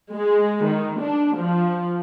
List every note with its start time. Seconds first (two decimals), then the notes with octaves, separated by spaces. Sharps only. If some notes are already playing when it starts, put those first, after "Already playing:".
0.13 G#3
0.67 D#3
1.00 D4
1.38 F3